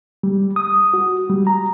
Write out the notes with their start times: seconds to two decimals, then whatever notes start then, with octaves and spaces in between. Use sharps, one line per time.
0.23 G3
0.56 D#6
0.94 F#4
1.30 G3
1.47 A#5